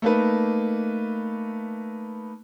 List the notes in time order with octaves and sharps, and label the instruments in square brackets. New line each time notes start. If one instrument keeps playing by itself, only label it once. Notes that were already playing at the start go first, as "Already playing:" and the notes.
[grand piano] A3 A#3 D#4 B4